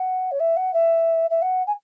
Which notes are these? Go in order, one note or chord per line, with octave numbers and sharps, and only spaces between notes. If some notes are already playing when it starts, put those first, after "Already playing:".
Already playing: F#5
C#5
E5
F#5
E5
E5
F#5
G#5